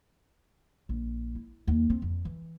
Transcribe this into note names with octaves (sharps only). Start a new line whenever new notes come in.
A#1
E4
D#2
C4
F2
E3